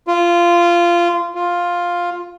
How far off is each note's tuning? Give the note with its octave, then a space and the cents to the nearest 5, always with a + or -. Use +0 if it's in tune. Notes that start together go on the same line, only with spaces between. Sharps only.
F4 -15
F4 +5